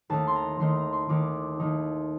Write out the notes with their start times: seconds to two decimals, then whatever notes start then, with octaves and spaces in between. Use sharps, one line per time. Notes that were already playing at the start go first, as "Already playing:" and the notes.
0.10 D#2 D#3 A3 D#4 A5
0.27 C6
0.36 A#5
0.59 D#2 D#3 A3 D#4 C6
0.77 A#5
0.93 C6
1.09 D#2 D#3 A3 D#4 D6
1.59 D#2 D#3 A3 D#4